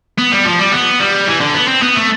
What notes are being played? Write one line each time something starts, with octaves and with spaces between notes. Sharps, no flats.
B3
G3
F3
G3
B3
G3
E3
D3
B3
C4
B3
A3